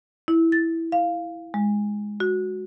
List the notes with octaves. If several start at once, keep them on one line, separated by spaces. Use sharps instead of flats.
E4
A6
F5
G#3
F#4